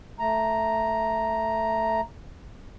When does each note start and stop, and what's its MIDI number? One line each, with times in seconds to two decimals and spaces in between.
0.19 2.01 57
0.19 2.01 82